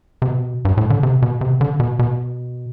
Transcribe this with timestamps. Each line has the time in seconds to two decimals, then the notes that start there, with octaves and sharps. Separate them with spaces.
0.22 C3
0.27 B2
0.65 G2
0.77 A2
0.90 D3
1.03 C3
1.22 B2
1.41 C3
1.61 D3
1.80 B2
1.99 B2